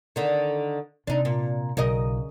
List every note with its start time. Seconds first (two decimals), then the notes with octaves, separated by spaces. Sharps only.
0.16 D3 D#3
1.07 C3 D4 D#4
1.25 A#2
1.77 B1 C#3 A#4 D#5